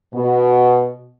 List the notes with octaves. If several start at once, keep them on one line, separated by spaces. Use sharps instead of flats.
B2